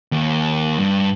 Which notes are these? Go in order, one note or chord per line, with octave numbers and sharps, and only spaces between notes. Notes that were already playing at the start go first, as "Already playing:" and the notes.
D#2
G2